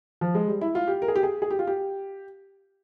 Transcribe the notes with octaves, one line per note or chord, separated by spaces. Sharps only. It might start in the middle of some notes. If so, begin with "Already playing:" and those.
F3
G#3
G3
E4
F4
G4
A#4
G#4
G4
G#4
G#4
G4
F4
G4